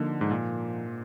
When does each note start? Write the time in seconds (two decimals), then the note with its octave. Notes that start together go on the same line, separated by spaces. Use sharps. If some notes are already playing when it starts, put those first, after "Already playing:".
Already playing: D3 F3 A#3 D#4
0.21 G#2
0.31 A#2